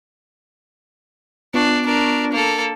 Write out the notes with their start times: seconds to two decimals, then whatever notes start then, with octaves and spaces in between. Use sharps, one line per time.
1.54 B3 D4 F4 C#6
1.86 D4 A#4
2.32 A#3 A4